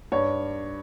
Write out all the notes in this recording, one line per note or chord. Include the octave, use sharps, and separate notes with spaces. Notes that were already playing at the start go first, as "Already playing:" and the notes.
G2 C#5